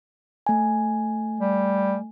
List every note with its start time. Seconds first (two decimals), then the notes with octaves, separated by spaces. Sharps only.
0.47 A3 G#5
1.40 G3